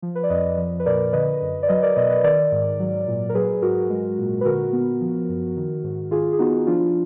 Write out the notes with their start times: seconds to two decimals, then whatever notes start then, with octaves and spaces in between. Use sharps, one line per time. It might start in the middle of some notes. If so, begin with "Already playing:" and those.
0.02 F3
0.15 B4
0.23 D5
0.30 F2 B4 D#5
0.57 F3
0.80 B4
0.86 A#2 A#4 D5
1.13 D3 B4 D#5
1.42 F#2
1.63 D5
1.68 F#3 B4 D#5
1.82 A#4 D5
1.96 B2 B4 D#5
2.10 B4 D#5
2.23 D#3 A#4 D5
2.52 G#2
2.79 F#3
3.07 A#2
3.29 A#4
3.34 F#3 G#4 B4
3.62 G#2 F#4 A#4
3.90 G#3
4.18 A#2
4.41 B4
4.45 D3 F#4 A#4
4.73 B3
5.01 F3
5.29 F#2
5.56 D#3
5.84 G#2
6.11 D#3 F4 G#4
6.33 G#4
6.39 B3 D#4 F#4
6.67 F3 D4 F4